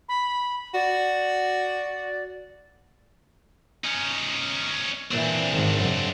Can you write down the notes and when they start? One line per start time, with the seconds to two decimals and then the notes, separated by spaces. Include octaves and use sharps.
0.09 B5
0.74 F#4 D5
3.84 C#4 D#4
5.11 A#2 E3 C4 D4
5.50 G#1 D#3
5.79 F#2 C#3